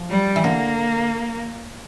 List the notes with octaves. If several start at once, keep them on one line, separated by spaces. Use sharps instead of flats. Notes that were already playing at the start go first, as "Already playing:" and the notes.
Already playing: F3
G3
E3
D3 A#3